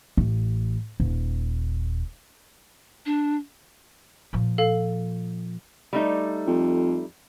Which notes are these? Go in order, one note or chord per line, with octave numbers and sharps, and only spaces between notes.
A1
D#1
D4
A#2 F3
A4 F5
G3 A3 D#4
F2